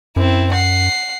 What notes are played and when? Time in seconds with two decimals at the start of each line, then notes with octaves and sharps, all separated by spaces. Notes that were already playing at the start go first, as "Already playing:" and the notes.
0.16 F#2 C4 E4
0.53 F#5 C7